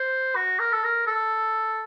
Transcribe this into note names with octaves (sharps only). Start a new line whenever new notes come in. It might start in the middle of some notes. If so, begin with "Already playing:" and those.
Already playing: C5
F#4
A#4
A4
A#4
A4